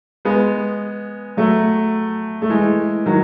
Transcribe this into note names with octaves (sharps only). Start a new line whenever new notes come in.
G#3 B3
F#3 A3
A3
E3 G#3
D#3 F#3